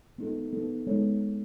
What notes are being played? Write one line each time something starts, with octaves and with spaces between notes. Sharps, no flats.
B3 D#4 A4
B3 D#4 A4
G#3 B3 D#4 A4 C#5